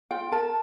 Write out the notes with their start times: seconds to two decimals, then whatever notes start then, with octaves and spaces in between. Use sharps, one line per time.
0.11 F4 G5
0.32 A#4 A5